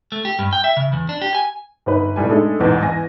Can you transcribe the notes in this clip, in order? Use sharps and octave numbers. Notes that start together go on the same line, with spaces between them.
A3
G4
G2
G5
E5
C#3
E2
D4
G4
G#5
G1 D#4 B4
F1 A2 G3 G#5
G#3 A3 D4 D#4 A4
A1 E2 G#2 B2
E2 E3 G#5 A#6